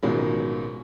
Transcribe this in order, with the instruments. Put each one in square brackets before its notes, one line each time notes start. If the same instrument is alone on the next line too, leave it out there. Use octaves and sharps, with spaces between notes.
[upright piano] A1 B2 D#3 F3 F#3 G#3